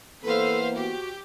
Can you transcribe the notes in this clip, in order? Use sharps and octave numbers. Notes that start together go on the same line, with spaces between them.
E3 A#3 B3 A4 B4 C5 F5
F#4 G4